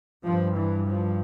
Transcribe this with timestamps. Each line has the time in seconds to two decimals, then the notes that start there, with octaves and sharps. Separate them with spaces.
0.24 G2 F3
0.56 E3
0.88 F3